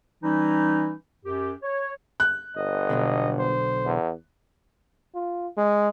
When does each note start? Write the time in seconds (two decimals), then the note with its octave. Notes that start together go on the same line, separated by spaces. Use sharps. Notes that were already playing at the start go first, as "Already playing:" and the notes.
0.23 E3 G3 C#4 D#4
1.25 F#2 G4
1.62 C#5
2.20 F#6
2.56 G1 D#5
2.90 B1 B2 D3
3.39 C5
3.85 E2
5.15 F4
5.57 G#3